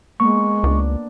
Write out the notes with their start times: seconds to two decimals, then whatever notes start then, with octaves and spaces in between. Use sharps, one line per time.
0.20 G#3 A#3 B3 C#6
0.63 C#2 D4